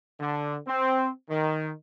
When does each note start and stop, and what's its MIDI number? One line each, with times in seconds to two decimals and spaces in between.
0.20 0.56 50
0.67 1.09 60
1.29 1.71 51